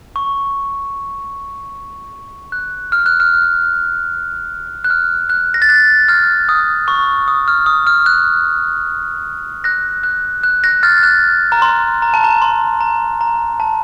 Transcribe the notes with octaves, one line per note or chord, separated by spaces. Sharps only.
C#6
F#6
F6
F#6
F6
F#6
F6
F#6
A#6
A6
F#6
F6
D#6
C#6
D#6
F6
D#6
F6
F#6
F#6 A#6
F#6
F#6
F#6 A#6
F6 A6
F#6
A#5
C6
A#5
A5
A#5
C6
A#5
A#5
A5